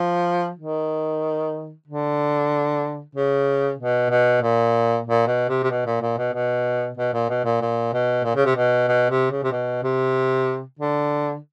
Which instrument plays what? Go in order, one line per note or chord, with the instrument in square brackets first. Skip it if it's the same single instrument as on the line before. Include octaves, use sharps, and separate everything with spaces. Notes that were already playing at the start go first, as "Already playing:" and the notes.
Already playing: [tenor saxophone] F3
D#3
D3
C#3
B2
B2
A#2
A#2
B2
C3
C3
B2
A#2
A#2
B2
B2
B2
A#2
B2
A#2
A#2
B2
A#2
C#3
C3
B2
B2
C3
C#3
C3
B2
C3
D3